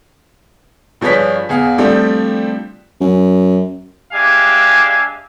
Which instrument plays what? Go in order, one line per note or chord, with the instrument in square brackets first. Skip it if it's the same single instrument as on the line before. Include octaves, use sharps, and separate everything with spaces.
[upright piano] G2 F3 G#4 B4 C#5 B6
E2 G#4 F5
F3 G3 A3 C4 D4 G4
[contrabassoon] F#2
[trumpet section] G#3 D4 G4 E5 F5 G#5